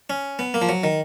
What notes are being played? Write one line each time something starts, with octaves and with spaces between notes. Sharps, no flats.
C#4
B3
A#3
F3
F#3
D#3